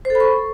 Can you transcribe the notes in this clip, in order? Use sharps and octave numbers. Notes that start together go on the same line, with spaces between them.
C5
A4
B5
C#6